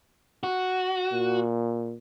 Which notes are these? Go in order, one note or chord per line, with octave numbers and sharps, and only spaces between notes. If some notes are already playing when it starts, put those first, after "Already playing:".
F#4
A#2